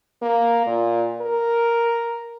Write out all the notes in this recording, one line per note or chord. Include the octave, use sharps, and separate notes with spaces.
A#3
A#2
A#4